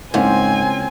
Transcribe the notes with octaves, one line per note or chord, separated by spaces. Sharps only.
C#2 G#2 A#3 C4 C#4 G#5